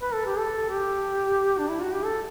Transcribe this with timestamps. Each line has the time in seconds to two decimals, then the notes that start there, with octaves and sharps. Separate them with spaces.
0.01 B4
0.14 A4
0.26 G4
0.38 A4
0.69 G4
1.59 D4
1.70 E4
1.81 F#4
1.93 G4
2.04 A4